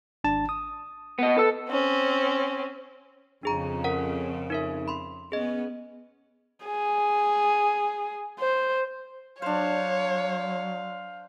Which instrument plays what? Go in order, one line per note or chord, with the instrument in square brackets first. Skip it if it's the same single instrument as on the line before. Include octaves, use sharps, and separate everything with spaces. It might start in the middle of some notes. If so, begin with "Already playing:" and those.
[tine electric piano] G#1 D4 A5
D#6
[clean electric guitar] B3 D#5
[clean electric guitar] A4 [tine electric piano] B4 E6
[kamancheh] C4 C#4
[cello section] F2 C#3 [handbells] D4 G#4 A#5
[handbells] A#4 F#5
D#4 A#4 E5
B5 C6
[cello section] B3 C#4 [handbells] G#4 D#5
[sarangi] G#4
C5
[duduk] F#3 [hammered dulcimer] D4 C5 [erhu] C#5 [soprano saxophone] F5